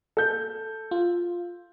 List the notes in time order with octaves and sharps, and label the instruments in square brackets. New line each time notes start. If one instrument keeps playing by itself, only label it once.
[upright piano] A4 G6
[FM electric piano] F4